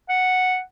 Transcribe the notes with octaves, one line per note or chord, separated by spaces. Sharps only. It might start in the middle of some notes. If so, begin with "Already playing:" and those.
F#5